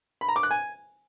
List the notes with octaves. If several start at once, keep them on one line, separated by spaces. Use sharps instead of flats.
B5
A#5
D6
F#6
G#5